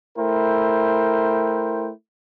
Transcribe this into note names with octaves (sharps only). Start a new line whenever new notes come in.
A3 E4 A#4 C5 G5